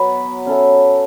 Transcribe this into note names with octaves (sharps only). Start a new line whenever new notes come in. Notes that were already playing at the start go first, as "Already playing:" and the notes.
Already playing: F#3 B3 F#4 B4
C#4 A4 C#5 E5